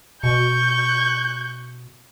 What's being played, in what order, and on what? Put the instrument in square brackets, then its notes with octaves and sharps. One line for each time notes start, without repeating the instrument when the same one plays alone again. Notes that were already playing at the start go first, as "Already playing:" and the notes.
[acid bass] B2 [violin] C#6 [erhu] G6